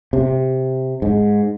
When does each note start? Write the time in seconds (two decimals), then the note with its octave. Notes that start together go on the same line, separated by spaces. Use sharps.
0.13 C3
1.02 G#2